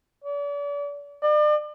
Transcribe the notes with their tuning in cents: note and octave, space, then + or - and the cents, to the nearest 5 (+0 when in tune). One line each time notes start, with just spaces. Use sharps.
D5 -40
D5 +40